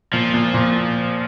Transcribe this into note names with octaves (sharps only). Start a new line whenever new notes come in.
A#2 F3
A#2
A#2